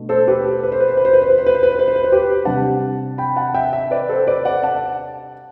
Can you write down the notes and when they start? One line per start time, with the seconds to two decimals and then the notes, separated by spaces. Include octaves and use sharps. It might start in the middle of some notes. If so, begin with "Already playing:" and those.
Already playing: B2 A3 D4
0.09 A4 C5
0.28 G4 B4
0.63 B4
0.72 C5
0.80 B4
0.88 C5
0.97 B4
1.05 C5
1.13 B4
1.22 C5
1.30 B4
1.38 C5
1.46 B4
1.55 C5
1.63 B4
1.71 C5
1.79 B4
1.88 C5
1.96 B4
2.04 C5
2.12 G4 B4
2.45 C3 G3 D4 F#5 A5
3.18 G5 B5
3.36 F#5 A5
3.54 E5 G5
3.73 E5 G5
3.91 B4 D5
4.09 A4 C5
4.27 B4 D5
4.45 D5 F#5
4.63 F#5 A5